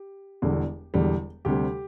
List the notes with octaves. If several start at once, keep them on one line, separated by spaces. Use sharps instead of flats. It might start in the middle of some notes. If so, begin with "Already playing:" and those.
Already playing: G4
E1 E2 D3 G3
E1 E2 D3 G3
D2 C3 G3 G4